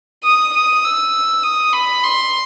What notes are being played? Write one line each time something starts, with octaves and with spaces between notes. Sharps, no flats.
D#6
D#6
E6
D#6
B5
C6